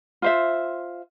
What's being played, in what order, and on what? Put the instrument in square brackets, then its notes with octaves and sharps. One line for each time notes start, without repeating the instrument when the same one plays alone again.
[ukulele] F4 C5 E5